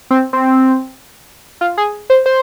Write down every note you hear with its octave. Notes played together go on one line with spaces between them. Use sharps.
C4
C4
F4
G#4
C5
C5